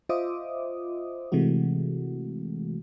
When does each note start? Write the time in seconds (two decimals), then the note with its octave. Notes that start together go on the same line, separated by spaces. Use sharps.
0.09 F4 C5 D#5 E5 D6 D#6
1.32 C3 E3 G#3 A3 F#4